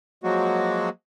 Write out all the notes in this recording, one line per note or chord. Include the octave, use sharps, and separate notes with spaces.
F3 F#3 G#3 A#3 F#4